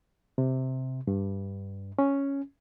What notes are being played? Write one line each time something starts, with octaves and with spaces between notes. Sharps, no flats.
C3
G2
C#4